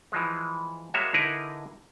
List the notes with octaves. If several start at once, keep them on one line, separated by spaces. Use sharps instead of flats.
E3 F3 G#3
G3 G#3 A#3 F#4 C#5 E5
D3 D#4 E4 G#4 A#4 B4